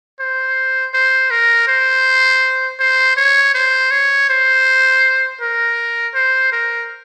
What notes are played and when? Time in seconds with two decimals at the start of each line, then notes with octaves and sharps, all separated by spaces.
0.20 C5
0.94 C5
1.31 A#4
1.68 C5
2.79 C5
3.17 C#5
3.55 C5
3.91 C#5
4.29 C5
5.41 A#4
6.15 C5
6.52 A#4